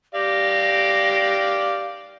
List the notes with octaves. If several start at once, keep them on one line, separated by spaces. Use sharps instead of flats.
G4 D5 F5 A#6